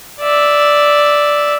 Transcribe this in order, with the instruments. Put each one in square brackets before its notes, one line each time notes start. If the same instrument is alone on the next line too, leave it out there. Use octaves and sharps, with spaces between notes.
[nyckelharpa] D5 E5